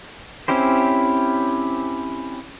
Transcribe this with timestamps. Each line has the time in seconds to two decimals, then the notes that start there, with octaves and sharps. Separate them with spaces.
0.48 C4 C#4 E4 G4 C5